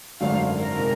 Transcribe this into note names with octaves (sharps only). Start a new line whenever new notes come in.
G#1 F#2 D3 F#3 A3 F5
A#4
C3 D#3 G#3